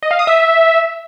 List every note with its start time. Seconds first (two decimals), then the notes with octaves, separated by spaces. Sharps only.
0.03 D#5
0.11 F5
0.19 D#6
0.27 E5